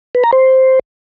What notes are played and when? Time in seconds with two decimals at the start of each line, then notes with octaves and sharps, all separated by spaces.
0.15 B4
0.24 A#5
0.33 C5